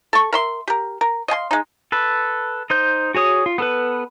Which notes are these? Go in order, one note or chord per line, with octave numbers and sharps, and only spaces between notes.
A4 C#6
A#4 E5 C6
G4 A#4
A#4
D#5 F5 G#5 C6
G#3 D#4
A4 B4
D#4 C5 G6
F#4 G#4 C#5 D#6
F4
B3 A4 B4